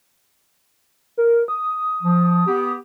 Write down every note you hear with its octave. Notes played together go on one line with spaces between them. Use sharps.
A#4
D#6
F3
B3 G4